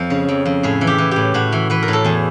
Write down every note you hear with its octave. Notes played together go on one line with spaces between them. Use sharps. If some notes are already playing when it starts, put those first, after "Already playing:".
Already playing: F2 F3
C#3
F2
F2
A2 G#4
E3
G4
E3
A2 G4
A2 F#4
E3
E3 B4
A#4
A2
A4
E2 G#4